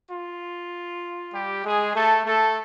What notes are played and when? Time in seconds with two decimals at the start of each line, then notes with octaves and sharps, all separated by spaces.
0.11 F4
1.34 G3 G4
1.65 G#3 G#4
1.96 A3 A4
2.26 A3 A4